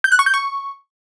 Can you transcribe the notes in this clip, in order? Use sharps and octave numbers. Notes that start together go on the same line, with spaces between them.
G6
F#6
C#6
G6
C#6